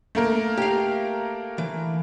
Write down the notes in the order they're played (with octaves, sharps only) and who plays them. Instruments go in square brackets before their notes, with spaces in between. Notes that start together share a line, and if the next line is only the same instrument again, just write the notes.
[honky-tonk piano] A3 A#3 A#4
[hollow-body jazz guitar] G4 F5
E3